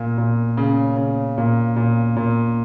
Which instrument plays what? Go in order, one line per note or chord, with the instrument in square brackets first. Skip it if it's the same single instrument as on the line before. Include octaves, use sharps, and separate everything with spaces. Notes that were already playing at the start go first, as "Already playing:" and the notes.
Already playing: [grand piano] A#2
A#2
C#3
C#3
A#2
A#2
A#2